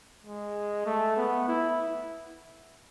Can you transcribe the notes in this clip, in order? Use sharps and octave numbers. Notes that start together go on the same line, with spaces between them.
G#3
A3
B3
E4